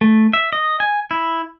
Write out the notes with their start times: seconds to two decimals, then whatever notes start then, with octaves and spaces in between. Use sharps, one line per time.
0.01 A3
0.33 E5
0.53 D#5
0.80 G#5
1.11 E4